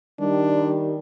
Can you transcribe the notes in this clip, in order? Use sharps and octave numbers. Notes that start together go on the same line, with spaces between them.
D#3 G3 D4